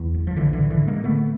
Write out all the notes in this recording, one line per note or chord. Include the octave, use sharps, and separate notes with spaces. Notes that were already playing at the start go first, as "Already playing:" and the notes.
Already playing: E2
F#1
F3
B1 D3 E3
D3 E3
A2
D3 E3
A2
G#3 A#3
D3 A3 B3